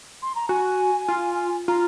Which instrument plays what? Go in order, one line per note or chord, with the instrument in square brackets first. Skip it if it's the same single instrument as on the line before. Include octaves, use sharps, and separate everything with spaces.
[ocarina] C6
A#5
[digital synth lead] F#4 [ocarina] G#5
[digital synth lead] F4
[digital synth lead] F4 [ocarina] A#5